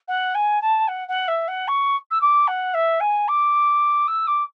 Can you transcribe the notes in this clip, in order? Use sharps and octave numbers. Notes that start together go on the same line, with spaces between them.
F#5
G#5
A5
F#5
F#5
E5
F#5
C#6
E6
D6
F#5
E5
G#5
D6
E6
D6